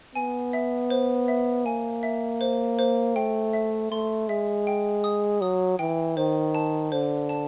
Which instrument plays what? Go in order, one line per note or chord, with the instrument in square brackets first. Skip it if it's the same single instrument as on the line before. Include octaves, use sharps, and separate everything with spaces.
[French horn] B3 [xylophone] G#5
[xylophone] E5
C5
E5
[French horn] A#3 [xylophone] G#5
[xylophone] E5
C5
C5
[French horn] A3 [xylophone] G5
[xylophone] E5
[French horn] A3 [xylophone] C6
[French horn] G#3 [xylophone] E5
[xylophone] G5
D#6
[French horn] F#3 [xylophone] D#6
[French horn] E3 [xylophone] G5
[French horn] D#3 [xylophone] C5
[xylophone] A5
[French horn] D3 [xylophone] C5
[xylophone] A5